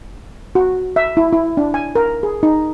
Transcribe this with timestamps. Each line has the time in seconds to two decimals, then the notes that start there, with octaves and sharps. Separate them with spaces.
0.55 F#4
0.96 E5
1.17 E4
1.33 E4
1.57 D4
1.74 G#5
1.95 A#4
2.23 G#4
2.43 D#4